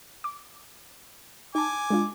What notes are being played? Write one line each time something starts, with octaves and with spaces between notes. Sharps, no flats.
D6
D#4 G#5 A5 D6
G#3 D4 F4